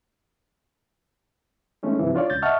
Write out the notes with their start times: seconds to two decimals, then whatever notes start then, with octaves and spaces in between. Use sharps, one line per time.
1.83 E3 G#3 A3 C#4 D#4
1.99 G2 C3 E3 F3
2.15 D4 F4 C#5 D5
2.30 C#2 G6 A6
2.42 D#5 E5 F#5 A5 C#6 F6